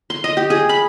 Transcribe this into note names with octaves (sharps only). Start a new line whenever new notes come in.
C6
D#5
G4
G#4
B5